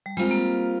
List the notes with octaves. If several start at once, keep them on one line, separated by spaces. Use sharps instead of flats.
G3
G3 G#3 C4 F4 A#4
A#3